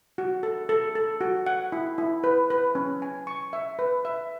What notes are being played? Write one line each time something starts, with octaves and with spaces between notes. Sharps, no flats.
F#4
A4
A4
A4
F#4
F#5
E4
E4
B4
B4
C#4
G#5
C#6
E5
B4
E5